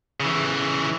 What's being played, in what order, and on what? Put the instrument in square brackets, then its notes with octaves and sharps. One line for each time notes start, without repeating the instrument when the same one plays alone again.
[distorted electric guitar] C#3 E3